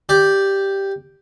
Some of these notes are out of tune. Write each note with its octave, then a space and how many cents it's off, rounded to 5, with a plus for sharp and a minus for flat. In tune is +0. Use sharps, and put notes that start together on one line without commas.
G4 +0 D5 +0